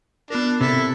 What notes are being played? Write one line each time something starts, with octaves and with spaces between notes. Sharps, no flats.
B3 D4 F4 A#4
C3 E4 A4 E5